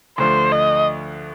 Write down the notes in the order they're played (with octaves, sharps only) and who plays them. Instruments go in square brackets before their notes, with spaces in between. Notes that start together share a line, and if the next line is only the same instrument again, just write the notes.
[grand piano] D2 D3 F3 [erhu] C5
[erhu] D#5